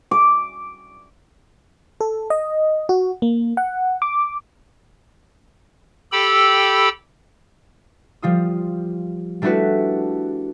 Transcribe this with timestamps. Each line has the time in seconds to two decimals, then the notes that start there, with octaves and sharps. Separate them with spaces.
0.11 D6
2.01 A4
2.30 D#5
2.89 F#4
3.22 A#3
3.57 F#5
4.02 D6
6.12 G4 A4 G5 B5 E6
8.22 F3 G3 F4 D#6
9.42 G3 A3 D4 E4 F#4 B4